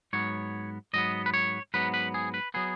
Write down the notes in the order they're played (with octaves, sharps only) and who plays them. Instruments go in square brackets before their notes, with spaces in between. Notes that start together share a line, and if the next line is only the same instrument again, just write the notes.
[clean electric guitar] G#2 F#3 B3 C#5
G#2 F#3 B3 D#5
B4
C#5
G#2 F#3 B3 B4
B4
G#4
B4
F#3 B3 G#4